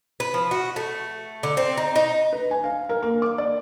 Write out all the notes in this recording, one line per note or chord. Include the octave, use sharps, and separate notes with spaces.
B4
F3
F#4
A3
D3
C4
D#4
D#4
B4
G#5
F5
A#4
A#3
D6
D5